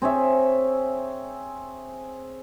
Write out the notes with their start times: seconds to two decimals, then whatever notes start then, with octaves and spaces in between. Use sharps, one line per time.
0.02 C4 G#4 C#5 E5